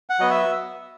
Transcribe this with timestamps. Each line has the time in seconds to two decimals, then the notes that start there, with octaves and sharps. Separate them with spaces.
0.10 F#5
0.19 F#3 B3 D#5
0.30 E5